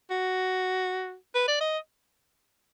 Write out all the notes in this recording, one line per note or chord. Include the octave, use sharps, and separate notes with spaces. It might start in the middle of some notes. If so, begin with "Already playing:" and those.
F#4
B4
D5
D#5